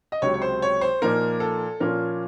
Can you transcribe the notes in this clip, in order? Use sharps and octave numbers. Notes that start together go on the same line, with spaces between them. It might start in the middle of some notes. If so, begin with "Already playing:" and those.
D#5
C#2 C3 F#3 C#5
C#5
C5
C#5
C5
A#2 F3 A#3 D#4 A#4
A4
A#2 F3 A#3 C#4 F4 A#4